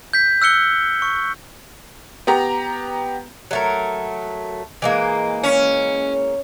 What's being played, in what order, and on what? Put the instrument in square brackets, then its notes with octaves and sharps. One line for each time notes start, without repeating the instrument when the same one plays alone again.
[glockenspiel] G6 B6
E6 F#6 C#7 G7
C#6
[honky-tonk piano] B3 G4 A#5
[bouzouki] F#3 A3 A#4
E3 G#3 A#3
[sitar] C#4